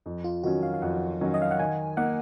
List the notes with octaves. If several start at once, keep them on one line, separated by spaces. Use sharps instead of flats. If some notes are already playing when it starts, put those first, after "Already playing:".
F2
F4
D#3 F#3 C#4 F#4
F5
F5
F2 F#5
D#3 F#3 C#4
D#5
F5
F#5
D#3 G#5
A#3 D#4 F#5